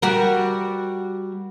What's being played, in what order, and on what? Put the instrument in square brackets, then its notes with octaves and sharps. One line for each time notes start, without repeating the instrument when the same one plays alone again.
[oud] G3 F#4 A#4